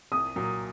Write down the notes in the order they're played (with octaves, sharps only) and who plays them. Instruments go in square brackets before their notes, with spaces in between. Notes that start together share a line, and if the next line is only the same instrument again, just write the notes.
[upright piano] C2 [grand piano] D#6
[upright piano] A#2 F#3